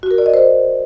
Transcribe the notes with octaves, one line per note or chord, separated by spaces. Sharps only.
F#4
A#4
D5
D#5
C5